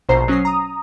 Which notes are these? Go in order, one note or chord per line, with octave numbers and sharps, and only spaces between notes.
A#1 B2 C5 A#5 C7
F#3 C#4 D#6 A#6 C7
A#5 D#6